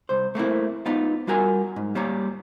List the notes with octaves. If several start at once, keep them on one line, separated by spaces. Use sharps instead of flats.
C2 C5
A3 A#3 C4 E4
B3 D#4 F4
G3 F4 F#4 A#4 G#5
G#2
G3 A#3 C#5 A#5